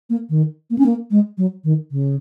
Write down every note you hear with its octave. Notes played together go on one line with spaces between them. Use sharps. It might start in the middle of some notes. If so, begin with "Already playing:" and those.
A#3
D#3
A#3
C#4
A#3
G#3
F#3
D#3
C#3